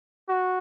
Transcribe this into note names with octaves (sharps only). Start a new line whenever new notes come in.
F#4